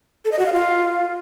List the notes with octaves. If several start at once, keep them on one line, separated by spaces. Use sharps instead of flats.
A4
D#5
F#4
F5
F4